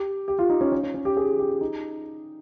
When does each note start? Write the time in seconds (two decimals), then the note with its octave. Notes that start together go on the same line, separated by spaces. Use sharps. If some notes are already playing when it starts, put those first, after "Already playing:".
Already playing: G4
0.28 G4
0.39 F4
0.50 D#4
0.61 C#4
0.72 C#4
0.83 C#4
0.94 C#4
1.05 G4
1.17 G#4
1.39 G4
1.61 D#4